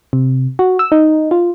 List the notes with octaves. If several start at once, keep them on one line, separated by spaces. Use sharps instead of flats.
C3
F#4
E6
D#4
F4